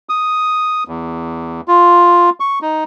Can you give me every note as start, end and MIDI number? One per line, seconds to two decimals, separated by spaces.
0.09 0.84 87
0.88 1.61 40
1.68 2.30 65
2.40 2.59 85
2.62 2.84 63